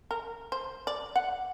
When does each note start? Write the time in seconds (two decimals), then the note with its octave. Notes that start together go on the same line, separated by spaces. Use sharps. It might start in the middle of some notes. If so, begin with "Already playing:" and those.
0.11 A#4
0.52 C5
0.87 D5
1.16 F#5